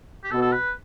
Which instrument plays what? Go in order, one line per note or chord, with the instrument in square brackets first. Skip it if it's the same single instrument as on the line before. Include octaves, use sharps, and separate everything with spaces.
[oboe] G4
[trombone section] B2 [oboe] A4
[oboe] A4
B4